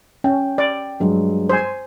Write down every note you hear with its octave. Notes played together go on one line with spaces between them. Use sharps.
C#4 G5
D5
G2 F#3 G#3
C5 G#5